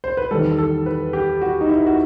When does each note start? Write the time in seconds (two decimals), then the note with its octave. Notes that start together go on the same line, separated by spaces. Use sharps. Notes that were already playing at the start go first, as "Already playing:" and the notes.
0.04 C5
0.17 B4
0.31 E2 D#3 G3 A4
0.58 A4
0.86 B4
1.13 G4
1.41 F#4
1.61 D#4
1.69 E4
1.87 F#4